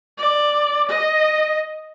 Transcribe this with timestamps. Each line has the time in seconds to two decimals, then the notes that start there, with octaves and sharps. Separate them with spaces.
0.18 D5
0.88 D#5